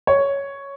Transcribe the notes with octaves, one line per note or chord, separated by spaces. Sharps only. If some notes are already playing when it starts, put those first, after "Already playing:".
C#5